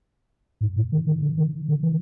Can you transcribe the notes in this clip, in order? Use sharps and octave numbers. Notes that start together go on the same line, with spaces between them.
G#2
A2
D#3
D#3
D3
D#3
D3
E3